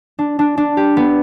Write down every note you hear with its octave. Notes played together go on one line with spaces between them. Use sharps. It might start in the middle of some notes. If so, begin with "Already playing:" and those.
D4
D4
D4
G4
B3